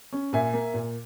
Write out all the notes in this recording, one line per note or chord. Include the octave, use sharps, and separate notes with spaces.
C#4
A#2 E5 G#5
A#3
A#2